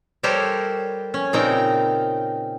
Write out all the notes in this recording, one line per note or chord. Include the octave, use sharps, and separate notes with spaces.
G3 G4 A4 A#4 C5 C#5
C#4
A#2 C#3 C4 D#4 A#4 G5